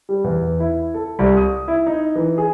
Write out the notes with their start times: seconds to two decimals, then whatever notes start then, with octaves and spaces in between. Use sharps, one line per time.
0.09 G3
0.24 E2
0.60 E4
0.94 A4
1.19 C2
1.37 D#6
1.68 E4
1.86 D#4
2.15 E3
2.38 G#4